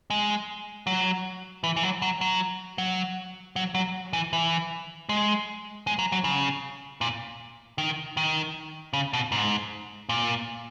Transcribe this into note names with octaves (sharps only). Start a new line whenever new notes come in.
G#3
F#3
E3
E3
F#3
F#3
F#3
F#3
F#3
F#3
E3
E3
G#3
G#3
F#3
F#3
C#3
A#2
D#3
D#3
C#3
B2
G#2
A#2